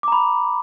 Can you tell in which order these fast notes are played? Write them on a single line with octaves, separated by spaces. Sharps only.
D6 A#5 B5